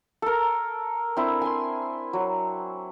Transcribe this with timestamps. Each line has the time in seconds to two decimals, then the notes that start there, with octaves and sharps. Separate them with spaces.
0.22 A4 A#4
1.17 C4 D4 E4 C5
1.41 G#5 C6
2.13 F#3